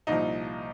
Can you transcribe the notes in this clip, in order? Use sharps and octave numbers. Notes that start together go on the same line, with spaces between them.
C2 A#2 F3 D#4